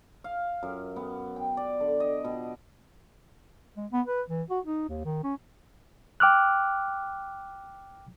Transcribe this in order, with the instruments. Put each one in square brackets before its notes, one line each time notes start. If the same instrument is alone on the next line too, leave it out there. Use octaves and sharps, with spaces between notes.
[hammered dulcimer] F5
F#2
B3
G5
D5
D3
D#5
B2
[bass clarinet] G#3
B3
B4
E3
F#4
D#4
D#2
D#3
C#4
[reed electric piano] G5 D6 F6 F#6